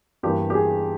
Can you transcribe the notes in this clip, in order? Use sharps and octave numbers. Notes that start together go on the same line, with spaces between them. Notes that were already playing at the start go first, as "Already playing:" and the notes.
G2 E3 A#3 G4
G4
G#4